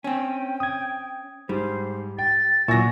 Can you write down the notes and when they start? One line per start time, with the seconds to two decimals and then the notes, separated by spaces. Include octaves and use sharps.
0.04 C4 C#4 G5
0.60 D#6 G#6
1.49 G#2 G3 C5
2.19 G5 A6
2.68 A#2 F#3 E4 G#5 C#6 A#6